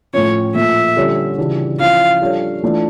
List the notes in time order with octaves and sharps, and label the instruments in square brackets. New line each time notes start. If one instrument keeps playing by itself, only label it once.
[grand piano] A2 F3 C#4 F4 [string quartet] C#5
[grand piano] A#2 F3 A3 [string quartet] E5
[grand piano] D3 G3 C#4 F4 C#5
C#3 E3 G3 D4 F4
[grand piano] F3 C#4 E4 [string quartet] F5
[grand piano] G3 D4 F4 A4 C#5
E3 A3 D4 F4